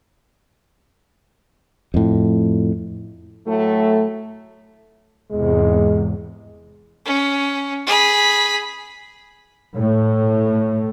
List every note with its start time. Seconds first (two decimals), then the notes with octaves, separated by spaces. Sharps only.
1.94 F2 A2
3.47 A2 F#3 A3
5.31 E2 G#2 C3 G#3
7.05 C#4
7.87 G#4 B5
9.76 A2